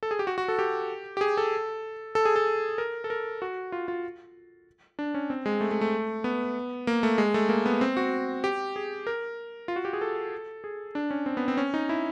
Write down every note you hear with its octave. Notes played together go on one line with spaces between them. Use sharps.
A4
G#4
G4
F#4
F#4
A4
G4
G4
G#4
A4
A4
G#4
A4
A#4
A4
A#4
F#4
F4
F4
D4
C#4
C4
G#3
A3
A3
A3
B3
A#3
A3
G#3
A3
A#3
B3
C4
F#4
G4
G#4
A#4
F4
F#4
G4
G#4
A4
G#4
D4
C#4
C4
B3
C4
C#4
D#4
E4